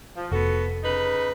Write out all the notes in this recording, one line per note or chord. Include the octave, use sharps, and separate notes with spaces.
F3
F1 B3 F#4 A4
C#3 D#4 B4